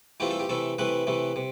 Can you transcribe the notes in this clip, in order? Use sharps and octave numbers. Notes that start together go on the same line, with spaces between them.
E3 A3 C4 F4 G4
A4
G4
C3 E3 A3 A4
C3 E3 A3 B4
C3 E3 A3
C3